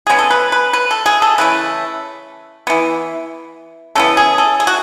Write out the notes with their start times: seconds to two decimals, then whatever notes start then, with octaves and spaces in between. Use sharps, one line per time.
0.07 C#3 G#3 B3 G#4
0.19 A4
0.31 B4
0.52 B4
0.73 B4
0.91 A4
1.06 G#4
1.22 A4
1.38 C#3 E3 A3 B4
2.67 E3 B3
3.95 C#3 E3 B3 A4
4.17 G#4
4.38 A4
4.60 G#4
4.67 F#4